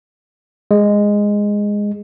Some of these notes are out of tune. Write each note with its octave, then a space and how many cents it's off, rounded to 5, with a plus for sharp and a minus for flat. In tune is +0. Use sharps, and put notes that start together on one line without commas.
G#3 -10